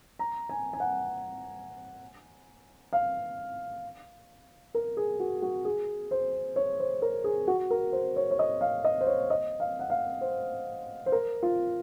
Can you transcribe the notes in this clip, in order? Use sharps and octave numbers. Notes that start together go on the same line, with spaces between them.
A#5
G#5
G#5
F#5
F5
A#4
G#4
F#4
F#4
G#4
C5
C#5
C5
A#4
G#4
F#4
A#4
C5
C#5
C#5
D#5
F5
D#5
C5
C#5
D#5
F5
F#5
F5
C5
C5
A#4
F4